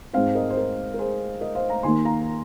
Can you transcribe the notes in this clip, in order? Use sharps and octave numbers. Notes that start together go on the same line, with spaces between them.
G#2 G#3 C4 C5 F5
A#4 D#5
C5
A#4
A#4
G#4 C5
A#4 D#5
C5 F5
F5 A#5
D#2 D#3 A#3 D#4 G#5 C6
F5 A#5